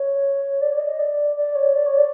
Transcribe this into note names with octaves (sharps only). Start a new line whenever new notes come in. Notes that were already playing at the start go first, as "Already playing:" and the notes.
Already playing: C#5
D5
D5
D#5
D5
D5
C#5
D5
C#5
D5